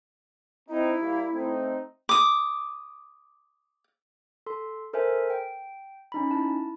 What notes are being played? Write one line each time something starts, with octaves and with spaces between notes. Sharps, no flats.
C4 D#4 E4
G3 A#3
A3 C4 D#4
D6 D#6
A4 C6
A4 A#4 C5 E5 G#5
G5
C#4 D#4 B5
E4 A5